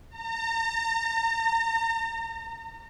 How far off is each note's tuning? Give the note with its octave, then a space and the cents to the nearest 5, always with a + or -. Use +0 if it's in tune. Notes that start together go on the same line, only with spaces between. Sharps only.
A#5 -40